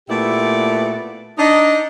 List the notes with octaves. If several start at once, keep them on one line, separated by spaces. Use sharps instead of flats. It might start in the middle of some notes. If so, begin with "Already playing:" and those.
A#2 A3 B3 E4 G4 D5
D4 D#4 D#5